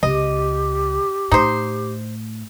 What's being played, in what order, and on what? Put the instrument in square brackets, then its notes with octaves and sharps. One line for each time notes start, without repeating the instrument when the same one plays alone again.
[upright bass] C#2 [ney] G4 [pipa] D#5
[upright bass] A2 [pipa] D#4 C5